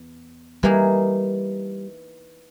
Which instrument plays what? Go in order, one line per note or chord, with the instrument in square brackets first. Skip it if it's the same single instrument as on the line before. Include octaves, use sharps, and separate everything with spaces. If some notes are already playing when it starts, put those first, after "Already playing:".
Already playing: [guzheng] E2
[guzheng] E3 A#3 D#4 G#4 [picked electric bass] G3